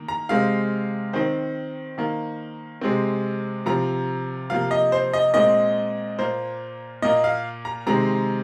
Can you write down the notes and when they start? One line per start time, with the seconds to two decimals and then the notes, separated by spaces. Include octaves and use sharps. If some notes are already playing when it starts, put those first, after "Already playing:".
Already playing: D#3 A#3
0.08 A#5
0.29 C3 G#3 C4 F5
1.13 D#3 C4 C5
1.98 D#3 A#3
2.81 C3 G#3 C4
3.66 C3 F3 C4 A#5
4.50 C3 F3 A#3 F5
4.71 D#5
4.92 C5
5.13 D#5
5.34 A#2 G#3 C4 D#5
6.19 A#2 A#3 C5
7.02 A#2 A#3 D#5
7.24 F5
7.65 A#5
7.86 C3 D#3 G#3 C4 A#5